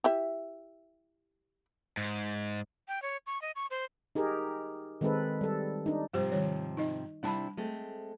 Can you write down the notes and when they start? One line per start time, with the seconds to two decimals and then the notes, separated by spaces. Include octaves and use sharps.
0.04 E4 G4 E5
1.97 G#2
2.88 G5
3.02 C#5
3.27 C#6
3.42 D#5
3.56 C#6
3.71 C5
4.15 D#4 G4 G#4 A#4
5.01 D#3 G#3 C4 D#4 A4 B4
5.41 G3 A4
5.86 D4 D#4
6.13 G#2 C3 F3 G3 G4 C5
6.32 D#3 G3 C#5
6.77 D#4 D#5
7.23 C3 G3 D4 E4 A5 B5
7.57 G#3 A3 C4